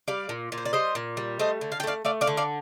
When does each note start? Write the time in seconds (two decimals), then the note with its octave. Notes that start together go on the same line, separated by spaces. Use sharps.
0.08 G3 D5 F5
0.29 A#2
0.52 A#2
0.58 C5
0.65 D5
0.73 G3 C5 D#5
0.95 A#2
1.17 G3
1.39 A3 C5 D#5
1.61 D3
1.72 F5
1.80 G5
1.83 A3 D5 F5
2.05 A3 D5 F5
2.21 D5 F5
2.27 D3
2.37 D5 F5